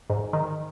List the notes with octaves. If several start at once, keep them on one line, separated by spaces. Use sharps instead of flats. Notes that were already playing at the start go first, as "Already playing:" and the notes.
G#2
D#3